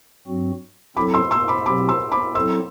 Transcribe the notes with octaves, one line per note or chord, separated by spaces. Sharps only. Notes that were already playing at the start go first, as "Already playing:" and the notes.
G2 F#3 C4 F#4
F#3 C4 E4 A4 B5 D6
C6 E6
C6 E6
B5 D6
B2 F#3 C4 G4 B5 D6
C6 E6
B5 D6
F#3 C4 E4 A4 C6 E6